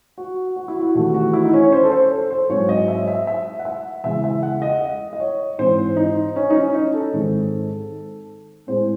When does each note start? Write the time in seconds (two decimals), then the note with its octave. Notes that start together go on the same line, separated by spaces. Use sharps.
0.18 F#4
0.56 F#4
0.68 E4
0.80 F#4
0.95 E2 C3 D#3 A3 C4 F#4
1.14 F#4
1.33 E4
1.45 D#4
1.53 C#4
1.64 C#5
1.72 C5
1.84 A4
1.92 C5
2.11 A4
2.31 C5
2.49 G#2 F#3 C4 C#5
2.69 D#5
2.88 E5
3.07 E5
3.27 E5
3.59 F#5
3.65 E5
4.04 E2 C#3 E3 G#3 E5
4.24 E5
4.43 F#5
4.62 D#5
4.81 D#5
5.13 D#5
5.20 C#5
5.58 G#2 E3 C4 C5
5.97 D#4
6.36 C#4
6.50 D#4
6.56 C#4
6.75 D#4
6.94 A4
7.13 G#2 D#3 G#3 C4
8.67 A2 G#3 C4 C5